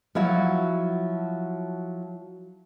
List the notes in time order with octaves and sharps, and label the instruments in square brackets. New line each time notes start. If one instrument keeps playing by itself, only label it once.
[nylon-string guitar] F3 F#3 E4 F#4